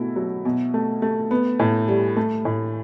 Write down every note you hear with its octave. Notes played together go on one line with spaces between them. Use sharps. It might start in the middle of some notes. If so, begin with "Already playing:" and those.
Already playing: B2 A3 E4 F#4
F#3
B2
A3
A3
B3
A2
G3
A3
A2